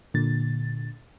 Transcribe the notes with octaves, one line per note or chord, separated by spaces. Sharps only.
A#2 D3 A6